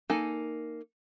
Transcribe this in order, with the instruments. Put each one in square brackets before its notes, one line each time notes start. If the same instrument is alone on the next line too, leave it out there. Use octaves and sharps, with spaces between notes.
[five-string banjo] A#3 D#4 A4 G#5